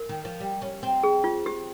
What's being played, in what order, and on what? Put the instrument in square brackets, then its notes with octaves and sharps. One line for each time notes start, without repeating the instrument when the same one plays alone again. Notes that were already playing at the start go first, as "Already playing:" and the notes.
Already playing: [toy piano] A#4
[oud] D#3
F3
G3
C#4
C4
[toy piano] G#4
F4
G4